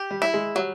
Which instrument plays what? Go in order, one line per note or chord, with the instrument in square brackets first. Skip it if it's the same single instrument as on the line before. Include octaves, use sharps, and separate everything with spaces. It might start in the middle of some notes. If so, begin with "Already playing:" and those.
Already playing: [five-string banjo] G4
[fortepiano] G3
[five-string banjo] E4
[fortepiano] G#3
[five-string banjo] F#3 [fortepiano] G3